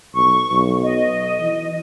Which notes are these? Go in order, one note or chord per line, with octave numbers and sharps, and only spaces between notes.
B1 C#6
B1
D#5
E3